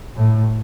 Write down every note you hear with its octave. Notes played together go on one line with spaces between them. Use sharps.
A2